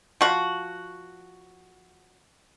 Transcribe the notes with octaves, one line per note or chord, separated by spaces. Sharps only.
F3 F#4